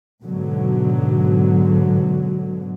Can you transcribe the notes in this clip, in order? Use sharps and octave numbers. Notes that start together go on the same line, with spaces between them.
G#2 B2 D3 F#3